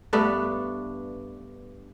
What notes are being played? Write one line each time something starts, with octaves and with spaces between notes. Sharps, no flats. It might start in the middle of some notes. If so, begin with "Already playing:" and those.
G2 A3 B3 D4